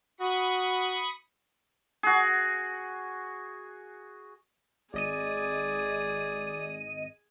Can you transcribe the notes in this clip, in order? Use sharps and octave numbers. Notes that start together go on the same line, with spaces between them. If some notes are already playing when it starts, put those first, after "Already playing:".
F#4 B5 C#6 D#6
F#4 G#4
G#1 G#4 D5 D#5 D#7